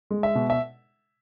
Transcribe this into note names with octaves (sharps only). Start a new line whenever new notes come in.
G#3
E5
B2
E5